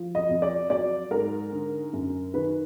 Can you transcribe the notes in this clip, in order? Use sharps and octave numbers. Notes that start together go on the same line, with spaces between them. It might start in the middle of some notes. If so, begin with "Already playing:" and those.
Already playing: F3
D#5
F2
D5
F#3 D5
G#2 A#4
D3
F#2
D#3 B4